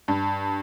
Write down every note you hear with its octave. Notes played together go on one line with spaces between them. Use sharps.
G2